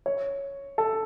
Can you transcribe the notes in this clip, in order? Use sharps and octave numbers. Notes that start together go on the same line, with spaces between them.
C#5
A4